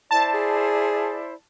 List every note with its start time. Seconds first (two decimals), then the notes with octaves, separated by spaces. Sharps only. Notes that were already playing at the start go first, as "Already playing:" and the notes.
0.11 E4 C5 D5 A5
0.34 G#4